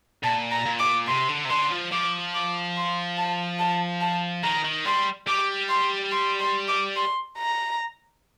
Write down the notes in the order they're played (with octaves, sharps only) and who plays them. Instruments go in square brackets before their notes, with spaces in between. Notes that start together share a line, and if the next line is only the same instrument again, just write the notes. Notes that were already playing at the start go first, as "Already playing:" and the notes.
[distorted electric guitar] A#2 [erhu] A5
[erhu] A#5
[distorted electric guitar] A#2
[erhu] D6
[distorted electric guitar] C3 [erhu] C6
[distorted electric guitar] D3
C3
[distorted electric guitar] D3 [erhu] C6
[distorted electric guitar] F3
[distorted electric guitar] F3 [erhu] D6
[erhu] D6
C6
A5
A5
A5
[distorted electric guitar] D#3 [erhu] A#5
[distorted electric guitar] D#3
[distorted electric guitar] G3 [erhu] C6
[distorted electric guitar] G3 [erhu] D6
[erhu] C6
C6
C6
D6
C6
A#5